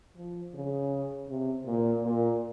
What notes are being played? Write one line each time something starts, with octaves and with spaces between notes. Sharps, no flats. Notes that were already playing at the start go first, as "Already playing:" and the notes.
F3
C#3
C3
A#2
A#2